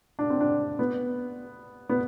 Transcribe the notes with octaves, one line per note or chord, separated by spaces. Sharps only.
D4
C4
D4
B3
B3